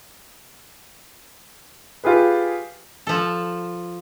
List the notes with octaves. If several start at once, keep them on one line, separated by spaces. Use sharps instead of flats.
F4 G4 G#4 B4
F3 A4